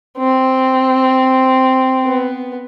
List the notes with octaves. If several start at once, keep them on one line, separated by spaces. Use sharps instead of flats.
C4
B3